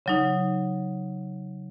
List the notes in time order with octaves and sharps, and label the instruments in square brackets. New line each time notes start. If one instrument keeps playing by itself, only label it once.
[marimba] C#3 F#3 D#4